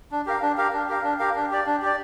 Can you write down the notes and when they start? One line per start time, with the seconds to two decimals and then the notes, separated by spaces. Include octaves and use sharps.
0.11 D4
0.26 G4 A#4 F5
0.42 D4
0.58 G4 A#4 F5
0.73 D4
0.89 G4 A#4 F5
1.04 D4
1.19 G4 A#4 F5
1.36 D4
1.51 G4 D5
1.66 D4
1.82 G4 D5